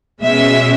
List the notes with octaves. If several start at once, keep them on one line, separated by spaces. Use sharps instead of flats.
B2 G#3 C#4 E5